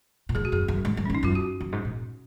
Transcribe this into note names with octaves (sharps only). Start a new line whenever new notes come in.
A#2
G#2 G#4
F#4
F#2 G#4
F#2
G#2
F#2
G#2 C#4
D#4
F#2 F4
F#4
F#2
G#2
A#2